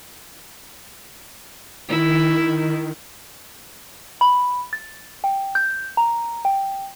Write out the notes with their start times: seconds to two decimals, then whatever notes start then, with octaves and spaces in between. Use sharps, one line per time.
1.89 D#3 E4
4.21 B5
4.73 A6
5.24 G5
5.55 G6
5.97 A#5
6.45 G5